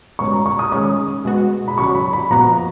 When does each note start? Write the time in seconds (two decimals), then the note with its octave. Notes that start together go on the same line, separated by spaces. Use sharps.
0.19 B2 G#3 C#4 C#6
0.33 A#5
0.46 C#6
0.59 D#6
0.72 D#3 G#3 C#4 D#6
1.25 B2 G#3 B3 F#4
1.68 B5
1.78 C#3 F#3 C#4 F#4 C#6
1.95 B5
2.13 B5
2.31 A#2 F3 B3 F#4 A#5